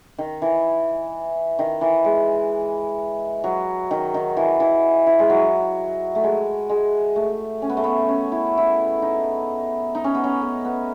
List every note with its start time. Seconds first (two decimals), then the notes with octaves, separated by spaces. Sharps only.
0.18 D#3
0.42 E3
1.59 D#3
1.81 E3
2.05 G#3
3.44 F#3
3.91 D#3
4.14 D#3
4.37 E3
4.60 E3
5.07 E3
5.19 G#3
5.30 F#3
6.15 A3
6.24 G#3
6.69 G#3
7.16 A3
7.62 C#4
7.70 B3
7.77 A3
7.84 B3
8.09 C#4
8.32 E4
8.58 E4
9.02 D#4
9.95 D#4
10.04 C#4
10.15 B3
10.24 C#4
10.41 B3
10.65 B3